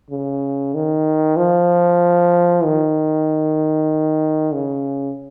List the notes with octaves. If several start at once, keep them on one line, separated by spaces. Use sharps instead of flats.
C#3
D#3
F3
D#3
C#3